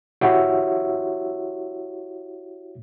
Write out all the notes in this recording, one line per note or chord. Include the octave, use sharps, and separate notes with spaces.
E4 F#4 G4 C#5 E5